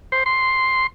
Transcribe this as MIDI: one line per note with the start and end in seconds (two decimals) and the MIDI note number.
0.12 0.23 72
0.26 0.87 84